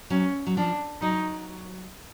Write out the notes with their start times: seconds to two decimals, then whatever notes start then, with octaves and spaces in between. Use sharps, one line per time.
0.10 F#3 C#4
0.47 F#3
0.57 F3 D4
1.01 F#3 D#4